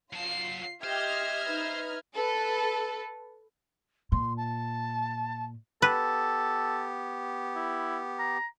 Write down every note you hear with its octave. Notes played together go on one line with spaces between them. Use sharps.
F#3 F4 A5 C7
G4 C5 D#5 E5 F6 G#6
D#4 B4
A4 B4
A#2 C6
A5
B3 G4 A4 B4
E4
A#5